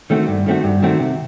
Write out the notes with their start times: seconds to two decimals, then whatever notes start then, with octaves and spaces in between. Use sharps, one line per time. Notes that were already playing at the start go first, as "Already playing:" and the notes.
0.10 D#3 A3 C4 F#4
0.28 G2
0.46 D#3 A3 C4 F#4
0.64 G2
0.83 D#3 A3 C4 F#4
1.00 C3